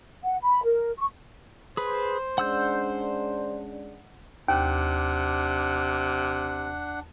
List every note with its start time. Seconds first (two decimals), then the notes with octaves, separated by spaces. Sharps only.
0.23 F#5
0.41 B5
0.64 A#4
0.98 C#6
1.77 G#4 B4 C5
2.38 G#3 C#4 D4 F#5 E6 G6
4.48 D#2 C3 D4 F#5